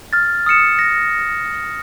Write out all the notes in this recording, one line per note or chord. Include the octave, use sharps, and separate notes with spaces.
F6 A6
D#6 F6 C#7 E7
A#6